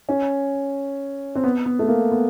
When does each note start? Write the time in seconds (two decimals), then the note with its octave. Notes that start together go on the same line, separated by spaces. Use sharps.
0.09 C#4
1.35 C4
1.44 B3
1.66 B3
1.79 A3
1.88 A#3
2.12 B3